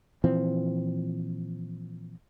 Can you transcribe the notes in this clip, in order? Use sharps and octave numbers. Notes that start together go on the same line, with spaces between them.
A#2 E3 F3 C4